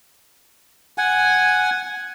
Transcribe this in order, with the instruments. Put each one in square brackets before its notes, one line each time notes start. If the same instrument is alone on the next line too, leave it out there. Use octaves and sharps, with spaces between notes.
[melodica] F#5 G#5